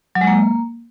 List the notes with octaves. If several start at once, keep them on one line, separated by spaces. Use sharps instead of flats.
F#3
G#3
A#3